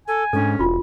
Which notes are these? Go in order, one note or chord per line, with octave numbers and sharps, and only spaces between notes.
A4 G#5
G#2 C#4 D4 A4
E1 F4 F#4